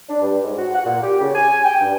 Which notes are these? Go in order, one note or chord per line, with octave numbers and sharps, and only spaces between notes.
D4
G2
G#2
F#4
F#5
A#2
G4
C#3
G#5
G5
G2